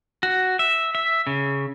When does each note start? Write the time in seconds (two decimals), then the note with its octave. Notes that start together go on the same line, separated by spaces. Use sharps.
0.23 F#4
0.59 E5
0.95 E5
1.27 C#3